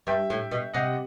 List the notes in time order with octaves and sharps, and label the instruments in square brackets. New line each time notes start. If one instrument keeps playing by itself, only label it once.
[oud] G2 [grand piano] E5 G5
[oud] A2
B2
[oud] C3 [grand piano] D#5 F#5